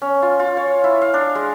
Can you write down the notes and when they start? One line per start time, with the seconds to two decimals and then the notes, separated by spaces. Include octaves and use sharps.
0.02 C#4
0.22 F4
0.39 F4
0.57 C#5
0.84 E4
1.02 F5
1.14 D4
1.35 G#3